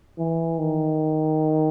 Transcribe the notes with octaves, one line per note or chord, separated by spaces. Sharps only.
E3
D#3